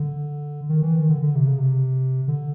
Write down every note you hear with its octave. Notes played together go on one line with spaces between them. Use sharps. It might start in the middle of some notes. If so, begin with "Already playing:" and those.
Already playing: D3
D#3
E3
D#3
D3
D3
C3
C#3
C3
D3